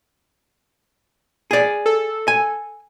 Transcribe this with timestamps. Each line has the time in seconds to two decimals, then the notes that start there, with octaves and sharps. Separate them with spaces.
1.51 G#4 D5
1.86 A4
2.28 G#5